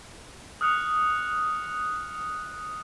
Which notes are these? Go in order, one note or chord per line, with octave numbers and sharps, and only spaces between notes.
D#6 F6 F#6 C#7 F7